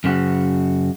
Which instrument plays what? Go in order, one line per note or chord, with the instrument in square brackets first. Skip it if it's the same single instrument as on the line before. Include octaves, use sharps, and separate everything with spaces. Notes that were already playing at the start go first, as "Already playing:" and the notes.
[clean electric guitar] F#2 C#3 F#4